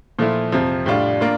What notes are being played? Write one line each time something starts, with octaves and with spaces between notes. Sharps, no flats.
A#2 F3 A3 E4
F2 C3 F3
A2 G3 D4 F4
A#3 D4 F4